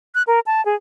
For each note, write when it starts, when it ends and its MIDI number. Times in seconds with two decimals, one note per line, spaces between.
0.15 0.23 90
0.27 0.40 70
0.46 0.64 81
0.65 0.75 68